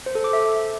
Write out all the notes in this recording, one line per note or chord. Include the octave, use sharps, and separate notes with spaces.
C5
A4
D6
E5